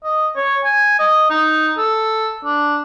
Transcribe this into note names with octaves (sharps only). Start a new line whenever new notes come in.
D#5
C#5
G#5
D#5
D#4
A4
D4